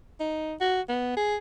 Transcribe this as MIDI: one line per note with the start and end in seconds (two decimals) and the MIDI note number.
0.20 0.54 63
0.60 0.81 66
0.89 1.12 59
1.17 1.36 68